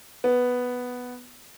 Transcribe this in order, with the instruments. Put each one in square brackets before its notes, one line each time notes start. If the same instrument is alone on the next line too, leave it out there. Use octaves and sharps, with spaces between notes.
[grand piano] B3